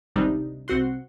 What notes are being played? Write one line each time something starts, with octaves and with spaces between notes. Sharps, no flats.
G#1 C#2 C3 G3 D4 D#4
C2 C4 F#4 F#5 C6